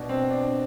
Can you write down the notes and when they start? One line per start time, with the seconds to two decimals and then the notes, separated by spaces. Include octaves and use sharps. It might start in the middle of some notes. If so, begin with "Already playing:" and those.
Already playing: B2 D4
0.09 C4
0.30 D4